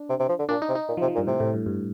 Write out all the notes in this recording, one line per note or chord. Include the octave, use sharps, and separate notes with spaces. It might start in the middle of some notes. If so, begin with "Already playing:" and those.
Already playing: D4
C3
C3
F3
D3
A#2 D4
D#4
C3
D#4
A#2
F3
C3
F3
A#2
G2
A2 C3
A2
G2
G2